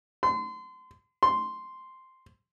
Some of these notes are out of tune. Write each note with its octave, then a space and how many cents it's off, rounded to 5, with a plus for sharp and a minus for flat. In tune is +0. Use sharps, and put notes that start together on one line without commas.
C6 -35
C6 -5